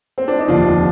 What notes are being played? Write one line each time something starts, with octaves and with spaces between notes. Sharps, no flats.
C4
D4
D#4
F1 D#2 D3 F3 D4 F4